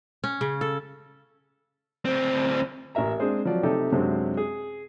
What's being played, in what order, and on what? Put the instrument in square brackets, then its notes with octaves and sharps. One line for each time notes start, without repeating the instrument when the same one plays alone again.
[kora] C#4
C#3
A4
[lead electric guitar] D2 C4
[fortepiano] A1 A#4 E5 A#5
G#3 C4 D4 G#4 C5 D5
F3 F#3 D5
C3 A3 C4 D#4 G4 A4
F#2 C3 F#3 G#3 C4 D4
G#4